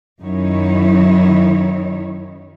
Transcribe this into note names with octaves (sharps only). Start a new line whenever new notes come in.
F#2 D#3 D#4 E4 C#5